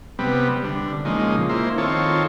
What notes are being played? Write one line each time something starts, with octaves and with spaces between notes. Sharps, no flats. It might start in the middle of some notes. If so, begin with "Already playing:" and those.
C3 G3 B3
D3
A#2 C#3 F3 G#3 D#4
A#3 E4 C5
D#3 C4 F4 A4 C#5